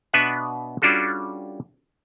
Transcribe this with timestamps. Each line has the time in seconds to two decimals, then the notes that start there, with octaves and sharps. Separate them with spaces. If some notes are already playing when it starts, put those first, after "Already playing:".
0.13 B2 B3 D4 B4 E5 F#5
0.82 G3 C#4 D4 F4 F#4 A4